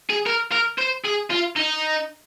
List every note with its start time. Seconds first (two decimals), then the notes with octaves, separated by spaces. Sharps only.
0.10 G#4
0.26 A#4
0.52 A#4
0.78 C5
1.05 G#4
1.30 F4
1.56 D#4